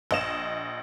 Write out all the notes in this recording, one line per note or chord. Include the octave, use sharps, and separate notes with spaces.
A#1 D#5 E7